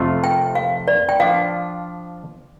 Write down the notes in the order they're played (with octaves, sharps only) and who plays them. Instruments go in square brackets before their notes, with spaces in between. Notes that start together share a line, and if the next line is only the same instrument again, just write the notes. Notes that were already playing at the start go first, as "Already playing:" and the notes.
Already playing: [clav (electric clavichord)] F2 C3 A3 F4
[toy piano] G5
F5
D5
G5
[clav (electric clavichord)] F3 D4 F4 D5 [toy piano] F5